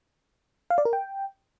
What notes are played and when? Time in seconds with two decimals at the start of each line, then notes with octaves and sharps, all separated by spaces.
0.70 F5
0.78 D5
0.85 A#4
0.93 G5